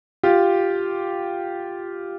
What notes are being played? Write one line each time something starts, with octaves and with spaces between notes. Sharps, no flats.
F4 G4